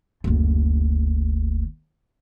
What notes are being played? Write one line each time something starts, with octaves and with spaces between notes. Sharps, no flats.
F#1 D2